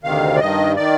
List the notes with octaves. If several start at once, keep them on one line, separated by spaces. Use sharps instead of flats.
D2 C3 D#3 F5
D5
G2 D#3 D#5
D#3 D5